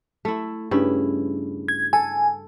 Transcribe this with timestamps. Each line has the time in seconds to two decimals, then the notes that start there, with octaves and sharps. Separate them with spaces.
0.25 A3 E4
0.71 G2 C#3 E4
1.68 G#6
1.93 A4 G#5